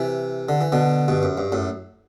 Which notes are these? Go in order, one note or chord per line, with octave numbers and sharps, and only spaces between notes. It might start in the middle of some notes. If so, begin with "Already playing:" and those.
Already playing: C3 E3
D3
E3
B2 D3
G2 B2
F#2
G2
F#2 A2